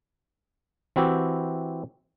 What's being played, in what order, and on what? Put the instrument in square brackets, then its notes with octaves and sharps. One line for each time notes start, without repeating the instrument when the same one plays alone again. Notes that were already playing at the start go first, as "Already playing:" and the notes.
[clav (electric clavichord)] E3 C4 E4 F#4 G4